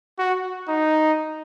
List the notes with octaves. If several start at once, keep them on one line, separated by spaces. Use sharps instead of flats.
F#4
D#4